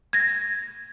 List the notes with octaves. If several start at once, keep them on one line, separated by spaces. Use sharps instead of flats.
G#6 A#6